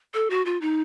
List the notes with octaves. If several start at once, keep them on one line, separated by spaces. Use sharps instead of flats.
A4
F#4
F4
D#4